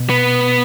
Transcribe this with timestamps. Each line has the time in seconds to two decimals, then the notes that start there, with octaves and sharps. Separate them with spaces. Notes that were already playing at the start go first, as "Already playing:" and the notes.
Already playing: B2
0.10 B3